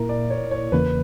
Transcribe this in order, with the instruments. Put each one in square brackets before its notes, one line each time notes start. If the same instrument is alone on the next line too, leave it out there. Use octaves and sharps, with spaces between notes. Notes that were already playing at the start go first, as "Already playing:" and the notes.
Already playing: [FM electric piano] A#2 A#3 E4 [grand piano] A#4
[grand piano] D5
C#5
C#5
[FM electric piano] E2 C#3 E3 A#3 [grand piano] B4